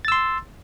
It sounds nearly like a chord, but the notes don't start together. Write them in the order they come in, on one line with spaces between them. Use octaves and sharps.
A6 E6 C6